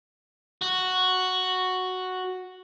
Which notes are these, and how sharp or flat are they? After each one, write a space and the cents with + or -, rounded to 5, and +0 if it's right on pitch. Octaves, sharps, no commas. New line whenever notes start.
F#4 +0